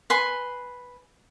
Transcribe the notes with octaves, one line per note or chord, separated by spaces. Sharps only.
B4 G#5 C6